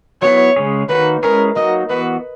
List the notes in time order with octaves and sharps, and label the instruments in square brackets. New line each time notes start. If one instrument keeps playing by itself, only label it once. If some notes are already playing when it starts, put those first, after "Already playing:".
[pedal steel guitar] F#3 B3 E4 [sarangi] C#5
[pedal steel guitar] C#3 G#3 C#4 G#4 C#5
[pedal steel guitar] D#3 A#3 D#4 F#4 [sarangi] B4
[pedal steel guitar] G#3 C#4 E4 G#4 C#5 [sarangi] A#4
[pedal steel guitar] F#3 A#3 D#4 F#4 [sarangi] D#5
[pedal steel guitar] E3 B3 F#4 [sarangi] B4